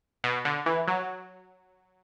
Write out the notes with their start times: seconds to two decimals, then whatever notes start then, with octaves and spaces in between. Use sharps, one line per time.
0.24 B2
0.45 D3
0.66 E3
0.88 F#3